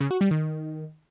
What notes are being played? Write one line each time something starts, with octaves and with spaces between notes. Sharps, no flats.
C#3
F#4
G3
D#3